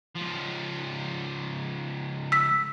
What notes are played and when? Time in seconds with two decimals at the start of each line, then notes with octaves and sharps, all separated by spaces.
0.16 C#2 F3
2.32 E6 B6